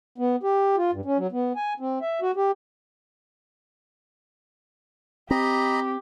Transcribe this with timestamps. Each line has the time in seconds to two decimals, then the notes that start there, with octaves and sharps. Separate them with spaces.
0.18 B3
0.43 G4
0.77 F4
0.93 G2
1.05 C#4
1.18 F#3
1.32 B3
1.56 G#5
1.80 C4
2.02 E5
2.22 F#4
2.36 G4
5.31 C4 G4 D#5 A#5 B5